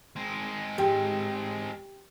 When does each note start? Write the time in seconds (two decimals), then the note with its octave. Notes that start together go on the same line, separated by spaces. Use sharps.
0.16 G#3 C4
0.78 G#2 G4 G5